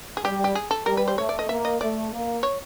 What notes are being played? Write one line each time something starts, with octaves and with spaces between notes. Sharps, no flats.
G#4
G3 G4
G4
G#4
A4
G3 A#4
B4
C5
A3 C#5
D5
D#5
A#3 E5
D#5
A3 D5
A#3
C#5